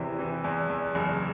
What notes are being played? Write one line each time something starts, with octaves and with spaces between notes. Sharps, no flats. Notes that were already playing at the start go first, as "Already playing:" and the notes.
Already playing: E2 C3 E3 E4
E3
E2
E2
F#1